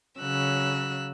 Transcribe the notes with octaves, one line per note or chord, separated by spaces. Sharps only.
C#3 F#3 E6 F#6